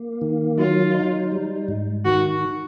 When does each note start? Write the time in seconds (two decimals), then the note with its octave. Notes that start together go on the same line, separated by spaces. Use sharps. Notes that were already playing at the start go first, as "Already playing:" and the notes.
Already playing: A#3
0.21 D#3
0.58 F#3 F4
0.94 D#4
1.32 G3
1.68 G#2
2.05 D#3 F#4